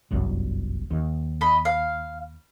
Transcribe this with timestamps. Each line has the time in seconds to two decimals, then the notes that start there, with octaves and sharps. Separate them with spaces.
0.11 G1 C2 F#2
0.91 D#2
1.41 D#5 B5
1.65 F5